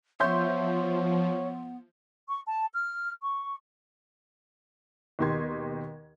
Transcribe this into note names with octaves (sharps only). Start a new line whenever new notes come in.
F3 B3 C#5 E5 C6 G6
C#6
A5
F6
C#6
D#2 B2 D#4 G4 C6 G#6